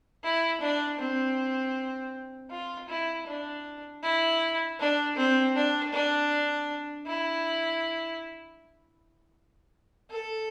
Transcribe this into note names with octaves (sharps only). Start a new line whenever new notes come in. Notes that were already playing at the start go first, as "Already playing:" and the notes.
E4
D4
C4
F4
E4
D4
E4
D4
C4
D4
D4
E4
A4